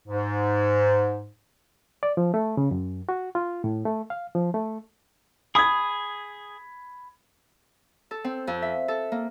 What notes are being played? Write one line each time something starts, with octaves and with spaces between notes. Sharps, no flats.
G#2
D5
F3
A3
C#3
F#2
F#4
F4
A2
A3
F5
F3
A3
G#4 B5 D#6 G#6
A4
C4
F2
E5
A4
A#3